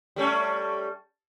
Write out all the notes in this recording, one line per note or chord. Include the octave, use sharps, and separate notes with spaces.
G3 A3 C#4